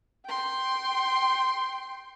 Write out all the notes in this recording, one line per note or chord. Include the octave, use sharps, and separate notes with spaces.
G5 C6